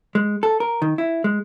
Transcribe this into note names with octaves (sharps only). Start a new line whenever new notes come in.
G#3
A4
A#4
D#3
E4
G#3